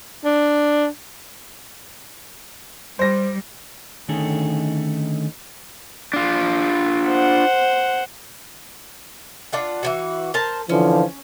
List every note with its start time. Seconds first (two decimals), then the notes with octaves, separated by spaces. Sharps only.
0.25 D4
2.99 G3 C5 A#6
4.08 D3 D#3 A3 C#4 D#4 G#4
6.14 D4 F4
7.08 C5 F#5
9.53 D4 F4 F#5
9.83 E3 F3 F#4
10.34 A#4 C5 A5
10.69 D3 E3 F3 C#4